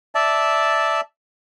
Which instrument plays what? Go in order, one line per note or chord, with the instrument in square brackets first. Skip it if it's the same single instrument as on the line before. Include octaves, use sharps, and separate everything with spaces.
[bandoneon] D5 E5 A5